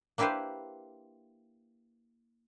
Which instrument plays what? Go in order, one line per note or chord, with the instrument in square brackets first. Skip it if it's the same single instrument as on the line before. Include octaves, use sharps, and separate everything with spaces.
[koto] A#3 D4 E4 G4 B4 C5